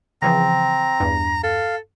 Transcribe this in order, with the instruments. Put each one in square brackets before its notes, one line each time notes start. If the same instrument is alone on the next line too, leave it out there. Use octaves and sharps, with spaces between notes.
[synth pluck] C#3 E3 F3 [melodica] C4 [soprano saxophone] A#5
[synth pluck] E2 G2
[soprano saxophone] A4 [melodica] F5